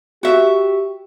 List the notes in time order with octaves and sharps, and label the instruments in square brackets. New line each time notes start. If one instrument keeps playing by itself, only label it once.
[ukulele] F#4 E5 [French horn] G4